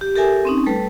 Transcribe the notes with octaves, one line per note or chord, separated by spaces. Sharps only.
G4
G4 A4 A#4 E5 G#5
C4 C#4 D#4
G3 A3 A4 B4